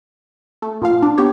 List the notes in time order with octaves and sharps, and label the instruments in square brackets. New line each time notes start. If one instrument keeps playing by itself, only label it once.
[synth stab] A3
A#2 F3 F5
D4
B3 G4 C#5